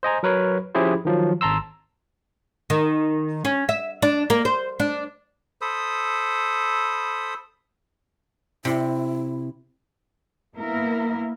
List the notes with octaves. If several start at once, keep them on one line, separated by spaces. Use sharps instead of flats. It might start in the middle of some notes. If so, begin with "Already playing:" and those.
C5 D#5 G#5 A#5
F#3 A#4 B4 C#5
F3 C#4 E4 G4 G#4 C5
D#3 F3 F#3
G#1 A5 A#5 C6 E6
D#3
C#4
E5
D4
A#3
C5
D4
A4 C5 B5 D#6
C3 E4
A#3 B3 E4 A#4